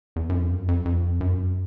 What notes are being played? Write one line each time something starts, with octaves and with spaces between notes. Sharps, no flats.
E2
F#2
F2
F#2
F2
F2
F#2